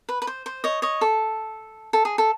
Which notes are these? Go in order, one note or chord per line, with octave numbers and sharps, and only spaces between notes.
B4
B4
C5
C5
C#5 D#5
C#5 D#5
A4
A4
G#4
A4